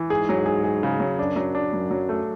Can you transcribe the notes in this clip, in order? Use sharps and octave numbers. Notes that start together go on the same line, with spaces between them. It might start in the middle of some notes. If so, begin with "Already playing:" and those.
Already playing: E3
G#2 G#4
F#3
G#4
G#4
C#3
F#3
F#2 D4
F#3
D4
F#2 F#3
F#3
A3